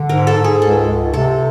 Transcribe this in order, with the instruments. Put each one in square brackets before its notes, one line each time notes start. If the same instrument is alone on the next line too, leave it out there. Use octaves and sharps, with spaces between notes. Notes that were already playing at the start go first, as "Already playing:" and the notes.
Already playing: [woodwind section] D3
[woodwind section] G#2 [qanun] A#4
[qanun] A4
[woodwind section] G#2
[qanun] G#4
[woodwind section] C#2 [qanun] A4
[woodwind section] C#2
[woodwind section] C3 [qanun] A4